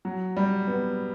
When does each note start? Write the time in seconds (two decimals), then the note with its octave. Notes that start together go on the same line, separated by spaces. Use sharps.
0.05 F#3
0.37 G3
0.67 B3